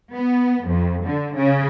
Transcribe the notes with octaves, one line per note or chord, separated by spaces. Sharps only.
B3
F2
D3
C#3